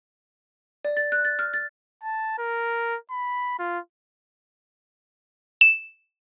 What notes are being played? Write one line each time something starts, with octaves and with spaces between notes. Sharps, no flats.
D5
A6
F#6
A6
F6
A6
A5
A#4
B5
F4
E7